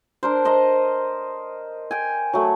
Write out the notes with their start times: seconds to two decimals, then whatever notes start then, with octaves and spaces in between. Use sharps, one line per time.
0.23 D4 A#4 C5
0.45 C5 D#5 A#5
1.91 G5 G#5
2.33 F#3 A3